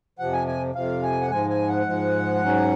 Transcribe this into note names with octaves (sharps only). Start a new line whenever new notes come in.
F2 C3 F3 F#5
G#5
G#5
F2 C3 F3 F5
G#5
F#5
G#2 F3 G#3 G#5
G#5
F#5
G#2 F3 G#3
G#2 F#3 C#4